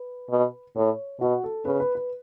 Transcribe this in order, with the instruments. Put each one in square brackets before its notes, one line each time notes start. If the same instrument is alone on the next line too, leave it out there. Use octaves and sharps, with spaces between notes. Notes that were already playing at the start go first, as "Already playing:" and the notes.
Already playing: [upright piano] B4
[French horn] B2
[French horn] A2 [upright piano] C#5
[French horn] B2 [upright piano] F#4
[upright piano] A4
[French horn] C#3 [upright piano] B4
[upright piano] B4
B4